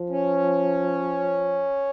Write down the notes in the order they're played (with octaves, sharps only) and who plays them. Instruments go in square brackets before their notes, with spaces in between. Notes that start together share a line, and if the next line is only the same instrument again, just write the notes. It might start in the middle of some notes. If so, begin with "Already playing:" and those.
Already playing: [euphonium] F3
[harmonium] C#4